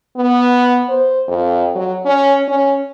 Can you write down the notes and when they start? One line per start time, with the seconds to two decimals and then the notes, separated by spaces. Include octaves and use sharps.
0.17 B3
0.89 C5
1.28 F2
1.75 F#3
2.05 C#4
2.48 C#4